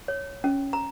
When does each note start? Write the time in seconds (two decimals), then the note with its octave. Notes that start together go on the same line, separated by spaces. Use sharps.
0.08 C#5
0.44 C#4
0.73 A#5